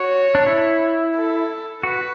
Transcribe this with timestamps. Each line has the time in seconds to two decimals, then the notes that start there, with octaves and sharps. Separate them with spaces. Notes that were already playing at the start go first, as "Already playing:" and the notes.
Already playing: F#4 C#5
0.35 D4
0.46 E4
1.15 A4
1.83 F#4 B4